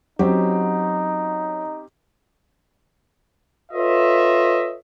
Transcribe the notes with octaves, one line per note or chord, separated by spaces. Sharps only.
F#3 C4 C#4 D#4 G4
F4 A4 B4 C#5 D#5 E5